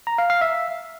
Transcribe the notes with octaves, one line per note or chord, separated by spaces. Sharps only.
A#5
F5
F5
E5